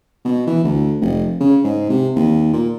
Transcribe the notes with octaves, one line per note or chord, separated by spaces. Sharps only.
B2
E3
D2
F1
C#3
G#2
C3
D#2
A#2